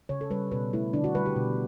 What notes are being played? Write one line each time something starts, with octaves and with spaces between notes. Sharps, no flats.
C#3 C#5
A4
G3 B4
B2 B4
A3 E4
D3 D4
F#4
G3 B4
G4
B2